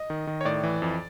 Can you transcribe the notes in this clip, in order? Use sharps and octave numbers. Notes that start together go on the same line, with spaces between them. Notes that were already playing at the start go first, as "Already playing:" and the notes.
Already playing: D#5
D#3
D#3
C#5
A2 D5
E3
F2